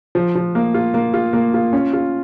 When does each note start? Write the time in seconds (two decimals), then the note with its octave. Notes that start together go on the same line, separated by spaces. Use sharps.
0.15 F3
0.35 F3
0.55 A#3
0.74 F4
0.94 A#3
1.14 F4
1.33 A#3
1.54 F4
1.73 C#4
1.93 F4